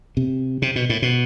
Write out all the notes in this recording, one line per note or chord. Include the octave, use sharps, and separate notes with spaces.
C3
C3
B2
A2
B2